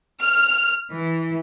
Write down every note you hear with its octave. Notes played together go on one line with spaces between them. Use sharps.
F6
E3